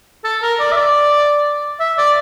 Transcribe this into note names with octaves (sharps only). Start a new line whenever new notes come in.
A4
A#4
D5
E5
D5
E5
D5